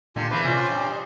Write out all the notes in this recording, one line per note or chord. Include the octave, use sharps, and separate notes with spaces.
A#2 D3 D#3 F4 G4 G#5
E2 D3 E3 A#3 B4 C5 D5
C3 C#4 F4 C5 D5
F4 G5 A#5 F#6
G2
D#5